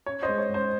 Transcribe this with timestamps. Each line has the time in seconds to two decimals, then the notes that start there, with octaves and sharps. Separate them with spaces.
0.06 C#4 C#5
0.23 C5 D#5
0.28 G#3
0.38 C#5
0.49 G#2
0.54 C5